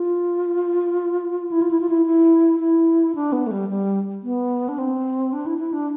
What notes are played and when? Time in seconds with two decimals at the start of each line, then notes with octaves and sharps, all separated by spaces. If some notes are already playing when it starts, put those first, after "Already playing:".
Already playing: F4
1.52 E4
1.62 F4
1.71 E4
1.81 F4
1.90 E4
2.06 E4
2.60 E4
3.15 D4
3.33 B3
3.47 A3
3.51 G3
3.69 G3
4.23 B3
4.69 D4
4.78 C4
5.33 D4
5.46 E4
5.59 E4
5.73 D4